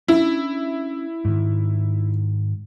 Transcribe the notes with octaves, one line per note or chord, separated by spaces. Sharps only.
C#4 D4 E4
G#2 D#3